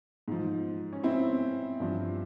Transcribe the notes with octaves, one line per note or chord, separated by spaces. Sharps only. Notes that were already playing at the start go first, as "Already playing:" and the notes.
G#2 F3
C#4
C4 E4
G2 F3